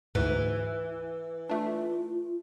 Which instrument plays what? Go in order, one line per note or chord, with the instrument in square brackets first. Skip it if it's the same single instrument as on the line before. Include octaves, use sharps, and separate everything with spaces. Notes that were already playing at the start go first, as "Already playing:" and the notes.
[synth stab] D2 G#2 [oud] E3
[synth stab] A3 D4 [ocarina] F4